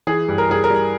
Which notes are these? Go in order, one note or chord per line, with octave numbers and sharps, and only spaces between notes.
E3 G#4
G2
A#4
G2 G#4
A#4
G3